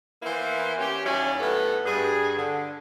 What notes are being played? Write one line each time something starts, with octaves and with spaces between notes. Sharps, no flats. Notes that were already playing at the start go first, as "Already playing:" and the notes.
E3 A#3 B3 E4 C5
C#4 G4
D#2 F#3 C#4 E4 D5
A2 A3 B3 A4 B4
G2 G#4
D3